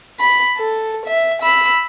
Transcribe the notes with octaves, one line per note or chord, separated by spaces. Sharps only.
B5
A4
E5
B5 E6